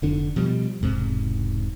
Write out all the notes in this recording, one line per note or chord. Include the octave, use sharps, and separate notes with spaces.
F1 D3 D4
B2 F3 G3
E1 G#2 C3